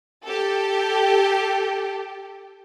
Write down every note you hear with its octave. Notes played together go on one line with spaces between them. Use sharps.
G4 A4